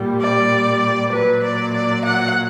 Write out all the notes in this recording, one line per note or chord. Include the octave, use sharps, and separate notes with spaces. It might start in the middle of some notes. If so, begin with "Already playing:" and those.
Already playing: A#2 G3
D5
A#2 F#3 B4
D5
D5
F#5